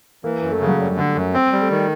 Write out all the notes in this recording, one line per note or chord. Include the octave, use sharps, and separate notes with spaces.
E3 A#3
F#2
A3
C#3
F#3
F#2 G3
D3
F#2
C4
G3
A3
D#3